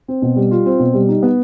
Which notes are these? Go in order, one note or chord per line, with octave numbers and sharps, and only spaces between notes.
C4
B2
G3
F4
C4
B2
G3
D#4
B3